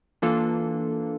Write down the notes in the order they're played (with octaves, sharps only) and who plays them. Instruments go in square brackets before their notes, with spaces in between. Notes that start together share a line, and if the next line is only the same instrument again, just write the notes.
[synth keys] E3 A#3 D4 F4 A4